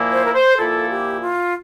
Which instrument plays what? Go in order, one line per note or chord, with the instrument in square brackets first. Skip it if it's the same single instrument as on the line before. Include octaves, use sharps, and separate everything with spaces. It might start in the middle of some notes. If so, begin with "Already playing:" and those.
Already playing: [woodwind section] A#2 F3 A#3 E4
C5
A#4
C5
A#2 F3 A#3 E4 A4
G4
F4